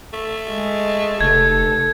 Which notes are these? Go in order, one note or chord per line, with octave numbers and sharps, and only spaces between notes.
A3
G#3
F1 A4 G#6